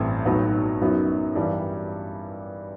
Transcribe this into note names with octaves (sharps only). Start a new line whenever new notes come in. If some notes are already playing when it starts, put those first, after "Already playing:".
Already playing: A1 G2 E3 A3 C4
B1 A2 F#3 B3 D#4
F#2 F#3 B3 D#4
G2 E3 G3